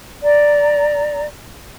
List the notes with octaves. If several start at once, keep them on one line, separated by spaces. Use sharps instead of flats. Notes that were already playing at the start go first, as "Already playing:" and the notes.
D5 A#5